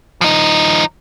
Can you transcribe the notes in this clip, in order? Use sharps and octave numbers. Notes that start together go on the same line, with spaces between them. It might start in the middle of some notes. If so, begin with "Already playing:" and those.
F3 D#4